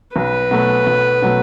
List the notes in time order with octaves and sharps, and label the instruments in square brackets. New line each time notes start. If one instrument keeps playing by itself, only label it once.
[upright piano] B1 [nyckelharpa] B4
[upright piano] B2 F#3 A3
B1
B2 F#3 A3